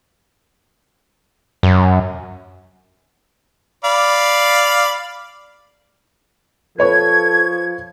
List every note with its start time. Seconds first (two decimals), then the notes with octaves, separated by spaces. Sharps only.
1.63 F#2
3.84 D5 F5 B5
6.78 F3 A4 B4 C#5 C#6 G#6